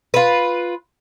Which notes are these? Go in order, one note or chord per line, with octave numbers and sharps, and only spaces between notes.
F4 B4